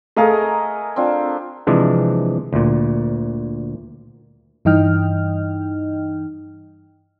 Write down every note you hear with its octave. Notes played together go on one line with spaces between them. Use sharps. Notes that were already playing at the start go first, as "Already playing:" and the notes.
A3 G#4 A#4 D#5 F5
C4 D4 F4
C3 E3 F3 G#3 D4
D2 A#2
G2 E3 D#4 D#5 G5 F6